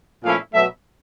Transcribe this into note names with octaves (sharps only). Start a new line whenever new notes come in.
A#2 F3 A3 C#4 E4 F5
B2 F#3 A3 E5